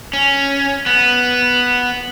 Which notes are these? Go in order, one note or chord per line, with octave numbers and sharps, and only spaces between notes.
C#4
B3